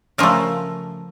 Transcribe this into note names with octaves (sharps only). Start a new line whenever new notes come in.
C#3 F3 A3 A#4